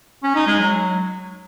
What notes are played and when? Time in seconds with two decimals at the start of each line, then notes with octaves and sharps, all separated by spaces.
0.23 C#4
0.35 D#4
0.47 G#3
0.59 F#3